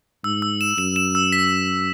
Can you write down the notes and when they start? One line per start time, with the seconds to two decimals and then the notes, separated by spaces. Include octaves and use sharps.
0.24 G#2 E6
0.42 E6
0.61 E7
0.78 F#2 E7
0.96 E7
1.15 E6
1.32 B6